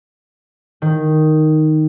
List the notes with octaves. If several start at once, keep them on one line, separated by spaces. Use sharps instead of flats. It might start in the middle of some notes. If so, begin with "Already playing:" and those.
D#3